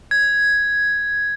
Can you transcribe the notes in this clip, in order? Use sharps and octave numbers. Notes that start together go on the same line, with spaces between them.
G#6